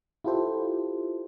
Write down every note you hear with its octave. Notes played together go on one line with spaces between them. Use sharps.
E4 F4 G4 A4 C5